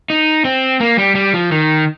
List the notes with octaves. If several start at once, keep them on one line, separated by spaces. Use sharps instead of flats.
D#4
C4
A#3
G3
G3
F3
D#3